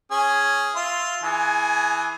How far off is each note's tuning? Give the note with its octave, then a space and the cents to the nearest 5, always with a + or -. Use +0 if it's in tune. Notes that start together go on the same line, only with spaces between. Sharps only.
C#4 +0 G#4 +0
F4 +0 E5 -5 C6 +0
E3 +0 G#4 +0 G#5 +30